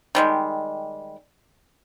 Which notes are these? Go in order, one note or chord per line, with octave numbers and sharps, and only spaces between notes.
D#3 G3 G#3